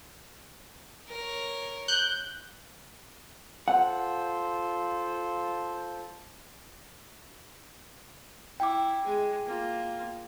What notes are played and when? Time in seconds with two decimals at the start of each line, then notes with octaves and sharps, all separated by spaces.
1.08 A#4 C#5
1.88 F#6 G6
3.68 F4 A4 C5 F#5
8.60 E4 G5 D6
9.04 G#3 G#4
9.46 A#3 F4